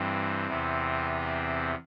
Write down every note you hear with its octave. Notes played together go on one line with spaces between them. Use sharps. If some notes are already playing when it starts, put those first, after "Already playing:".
Already playing: G2 E3 C4
E2 C3 E3